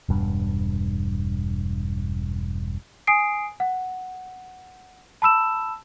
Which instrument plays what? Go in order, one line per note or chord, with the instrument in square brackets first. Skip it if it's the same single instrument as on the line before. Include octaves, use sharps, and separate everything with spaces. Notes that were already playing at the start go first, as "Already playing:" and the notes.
[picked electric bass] E1 G2
[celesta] G#5 D#6 C7 D7
F#5
A5 B5 E6 E7